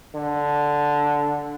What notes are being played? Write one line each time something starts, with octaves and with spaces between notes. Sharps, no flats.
D3